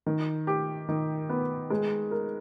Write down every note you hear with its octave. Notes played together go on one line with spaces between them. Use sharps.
D#3
G4
D#3
B3
G#3
A#4